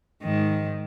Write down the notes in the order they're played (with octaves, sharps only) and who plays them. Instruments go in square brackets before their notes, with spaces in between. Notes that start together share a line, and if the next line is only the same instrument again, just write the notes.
[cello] G#2 D#3